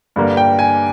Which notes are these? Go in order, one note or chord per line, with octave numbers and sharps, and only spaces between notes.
G2 D3 G3 A#3
G5
G#5